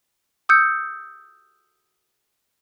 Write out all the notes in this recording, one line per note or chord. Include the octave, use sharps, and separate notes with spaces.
D#6 E6 G6 C#7